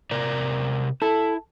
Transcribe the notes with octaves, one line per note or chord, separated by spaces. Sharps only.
C3 A#4 D5
E4 A4